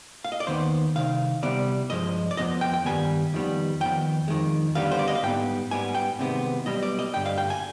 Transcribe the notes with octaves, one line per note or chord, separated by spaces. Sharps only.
F5
D#5
D5
D#2 D#3 B3 C5
C2 C3 D#3 F5
C2 C3 G3 B3 D5
G2 F3 G#3 D#5
D5
F2 C3 F3 B3 D#5
G5
G5
G2 D#3 G3 B3 G#5
F2 D#3 G3 B3
F2 D#3 B3 G5
F2 D#3 G#3
D2 D3 G3 B3 F5
C5
D5
D#5
F5
G#2 G3 B3 G5
G#2 G3 B3 G#5
G5
C2 C3 D#3 G#3 B3
B1 B2 G3 B3 D#5
D5
D#5
G2 D3 G3 G5
F5
G5
G#5